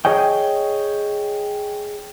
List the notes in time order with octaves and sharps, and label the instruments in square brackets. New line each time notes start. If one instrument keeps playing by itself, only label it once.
[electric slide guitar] G#4 C#5 D#5 G5